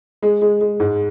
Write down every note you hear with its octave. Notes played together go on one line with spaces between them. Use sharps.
G#3
G#3
G#3
G#2